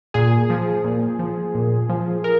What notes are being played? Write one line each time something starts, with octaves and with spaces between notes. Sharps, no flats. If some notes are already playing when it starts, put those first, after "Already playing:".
A#2 G#4
F3
A#2
F3
A#2
F3
A#4